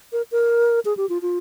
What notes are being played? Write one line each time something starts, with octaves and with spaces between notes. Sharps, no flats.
A#4
A#4
G#4
G4
F4
F4